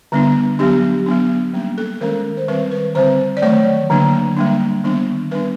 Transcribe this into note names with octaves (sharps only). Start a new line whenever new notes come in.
D3 G3 B3 D4
F#3 B3 D4 G4
F#3 B3 D4
G3 A#3 C#4
A4
D#3 G#3 C#4 A#4
C5
D#3 G3 C4 B4
B4
D3 G3 C4 C5
D5
D#3 F#3 A3 C#5
D3 F#3 A#3 D4
G3 A#3 D4
D#3 G3 B3 D4
G3 B3 D4 B4